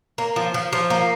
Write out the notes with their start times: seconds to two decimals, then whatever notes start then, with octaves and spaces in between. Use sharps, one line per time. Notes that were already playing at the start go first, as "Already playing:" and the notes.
0.18 A#3
0.36 F3
0.54 F3
0.73 F3
0.90 A#3